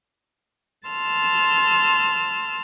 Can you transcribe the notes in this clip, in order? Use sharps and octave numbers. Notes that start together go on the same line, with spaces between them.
A5 C6 E6 F6